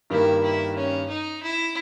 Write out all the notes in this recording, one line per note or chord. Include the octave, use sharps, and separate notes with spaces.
G2 D#3 G3 A#3 E4
E4
C#4
D#4
E4